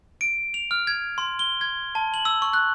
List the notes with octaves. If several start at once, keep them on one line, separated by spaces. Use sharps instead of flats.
D7
F7
F6
G#6
C6
G7
G#6
A5
F#7
E6
C#6
F#6